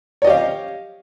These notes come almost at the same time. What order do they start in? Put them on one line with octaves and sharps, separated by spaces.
C#5 D#5 G4 F5